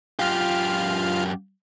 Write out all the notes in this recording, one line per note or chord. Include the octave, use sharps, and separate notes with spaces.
F#2 F4 G4 F6